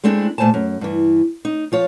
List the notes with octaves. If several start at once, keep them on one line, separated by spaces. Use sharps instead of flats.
G#3 A3 C4 D4 E4
A#2 A3 C5 G#5 A5
F#2
G2 E3
D#4
F3 F4 C#5